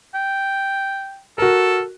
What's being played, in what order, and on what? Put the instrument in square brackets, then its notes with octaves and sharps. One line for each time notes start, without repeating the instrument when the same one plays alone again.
[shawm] G5
[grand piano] F#4 A#4 [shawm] A4